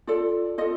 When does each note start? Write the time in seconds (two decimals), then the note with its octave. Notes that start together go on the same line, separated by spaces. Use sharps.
0.07 F4 A4 D5
0.58 F4 A4 D#5